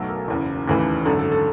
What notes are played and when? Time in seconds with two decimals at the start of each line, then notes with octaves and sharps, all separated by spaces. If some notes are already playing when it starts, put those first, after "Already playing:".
Already playing: B1 B2 F#3 A3 A4
0.09 A#4
0.28 F#1 E2 C#3
0.68 F1 D#2 C#3 E3
1.05 G#1 F#2 D3 A4
1.19 A4
1.32 A4